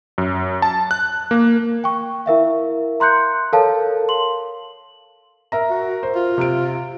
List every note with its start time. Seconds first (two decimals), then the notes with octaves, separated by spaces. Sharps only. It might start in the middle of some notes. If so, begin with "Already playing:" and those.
0.18 F#2
0.62 A5
0.91 F#6
1.31 A#3
1.84 G5 C#6
2.26 E4 A#4 E5 F5
3.00 A#5 C6 F#6 G6 C#7
3.53 A4 A#4 C#5 F5 A5
4.09 C6 F#7
5.52 A#4 E5 A#5
5.70 F#4
6.03 C5
6.15 F4
6.38 C3 D7